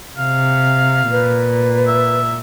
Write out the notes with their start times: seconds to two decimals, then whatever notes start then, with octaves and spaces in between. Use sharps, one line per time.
0.18 C3 F5
1.11 A#2 B4
1.87 E5